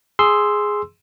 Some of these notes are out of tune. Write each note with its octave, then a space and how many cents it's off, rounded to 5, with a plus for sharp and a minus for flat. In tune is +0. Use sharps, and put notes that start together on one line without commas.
G#4 +0 C6 +0 E6 +0